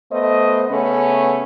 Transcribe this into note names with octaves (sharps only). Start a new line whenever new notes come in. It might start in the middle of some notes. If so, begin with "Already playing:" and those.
A3 B3 C5 D#5
C#3 A3 B3 C#4